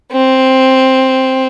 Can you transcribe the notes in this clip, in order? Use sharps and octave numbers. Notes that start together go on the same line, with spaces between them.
C4